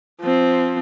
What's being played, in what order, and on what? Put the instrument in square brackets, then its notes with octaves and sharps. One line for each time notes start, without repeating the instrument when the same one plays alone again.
[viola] F3 C4